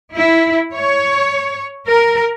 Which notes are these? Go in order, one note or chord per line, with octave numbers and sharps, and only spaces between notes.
E4
C#5
A#4